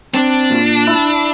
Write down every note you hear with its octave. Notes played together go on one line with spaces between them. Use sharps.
C4 D4
A#2
E4